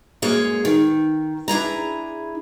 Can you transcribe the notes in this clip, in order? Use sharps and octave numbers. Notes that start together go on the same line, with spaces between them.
F#2 G#3 A#3 G#4 C#5 F5
D#3
D4 E4 G#4 A#5